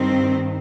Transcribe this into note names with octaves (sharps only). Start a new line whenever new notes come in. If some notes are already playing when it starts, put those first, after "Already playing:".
Already playing: G2 D#3 C4